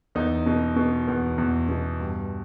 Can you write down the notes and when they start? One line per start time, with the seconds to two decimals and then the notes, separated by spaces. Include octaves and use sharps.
0.15 E2 D#4
0.46 B2
0.76 B2
1.07 E2 B3
1.38 E2
1.69 B2
2.00 G2